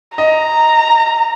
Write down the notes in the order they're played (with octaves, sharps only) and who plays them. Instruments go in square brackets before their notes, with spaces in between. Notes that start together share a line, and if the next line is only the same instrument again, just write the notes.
[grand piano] D#5 [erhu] A#5